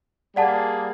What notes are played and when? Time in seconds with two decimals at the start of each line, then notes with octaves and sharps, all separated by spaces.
0.36 G3 A#3 G#4 D5 F#5 A5